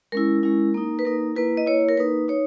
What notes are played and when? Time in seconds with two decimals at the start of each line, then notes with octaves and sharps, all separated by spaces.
0.12 G#3 C#4 E4 A#4
0.43 G#3 C#4 E4
0.74 A#3 D#4
0.99 B4
1.05 A#3 D#4 A#4
1.36 A#3 E4 B4
1.57 D#5
1.66 A#3 E4 C#5
1.88 A#4
1.97 A#3 D#4 B4
2.28 D#4 C#5